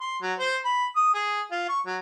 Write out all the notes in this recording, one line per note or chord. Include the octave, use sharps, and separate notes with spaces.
C6
F#3
C5
B5
D#6
G#4
F4
C#6
F#3